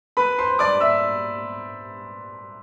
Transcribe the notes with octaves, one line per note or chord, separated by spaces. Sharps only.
B4 B5
C5 C6
D5 D6
E5 E6